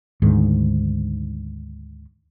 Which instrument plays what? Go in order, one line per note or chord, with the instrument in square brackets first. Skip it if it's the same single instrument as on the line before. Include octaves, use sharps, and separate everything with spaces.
[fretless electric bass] D2 G#2 D#3